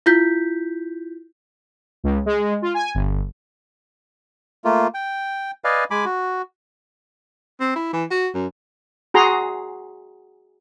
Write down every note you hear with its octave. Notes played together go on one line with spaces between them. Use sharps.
E4 F4 G6 B6
C#2
G#3
F4
G#5
G1
A3 A#3 F4
G5
B4 D5 D#5 F5 G#5
G#3 G#5 B5 D6
F#4
C4
E4
E3
F#4
F#2
F#4 G#4 A#5 C6